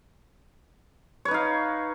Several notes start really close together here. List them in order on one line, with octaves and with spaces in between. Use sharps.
C#5 B4 D#4 F5